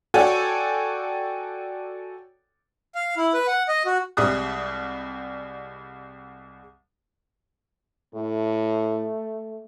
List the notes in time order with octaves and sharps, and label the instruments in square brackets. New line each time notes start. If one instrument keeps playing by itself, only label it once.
[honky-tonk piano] F#4 A4 C#5 D5 G5 G#5
[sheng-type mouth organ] F5
E4
B4
F#5
D#5
F#4
[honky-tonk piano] C2 G3 G#3 D#6 F#6
[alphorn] A2 [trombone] A3